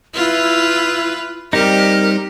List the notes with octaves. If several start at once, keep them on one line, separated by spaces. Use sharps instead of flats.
E4 F4 B4
G3 C4 D#4 G4 A#4